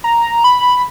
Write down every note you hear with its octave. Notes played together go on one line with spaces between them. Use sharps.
A#5
B5